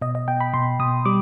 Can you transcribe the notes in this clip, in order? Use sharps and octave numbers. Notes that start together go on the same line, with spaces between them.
B2 D#5
D#5
B2 G5
B5
B2 C6
B2 D#6
G3 D6